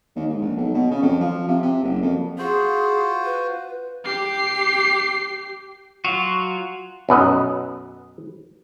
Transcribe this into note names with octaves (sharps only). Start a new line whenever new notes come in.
D#2
G#2
A#1
B1
B2
C#3
F2
F3
C3
C3
F#1
F2
F4 F#4 G#4 C5
B4
G4 C7
F#3 F4 F#4
B1 F#2 B4 D#5